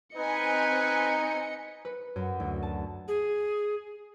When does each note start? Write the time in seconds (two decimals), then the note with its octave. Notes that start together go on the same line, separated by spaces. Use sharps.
0.16 C4 D#4 B4 D#5 G#5 C#7
1.85 B4
2.16 F#2
2.40 D2
2.63 A5
3.08 G#4